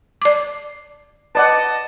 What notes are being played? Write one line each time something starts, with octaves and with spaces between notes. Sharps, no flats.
D5 D6
B4 D5 D#5 F#5 A5